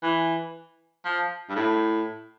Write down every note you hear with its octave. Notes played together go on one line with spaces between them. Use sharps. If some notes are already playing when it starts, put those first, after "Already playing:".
E3
F3
G2
A2